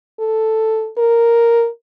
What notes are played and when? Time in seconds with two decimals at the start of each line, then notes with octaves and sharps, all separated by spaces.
0.20 A4
0.98 A#4